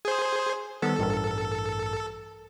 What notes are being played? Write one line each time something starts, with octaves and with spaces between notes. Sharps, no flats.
G#4 C5
D#3 G3 B3 A4
A1 G2 A#4